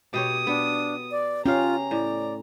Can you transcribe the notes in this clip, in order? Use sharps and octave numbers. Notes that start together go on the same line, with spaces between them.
B2 G4 C#5 D#6
B3 D4
D5
C#4 F4 G4 F5 A#5
A2 D5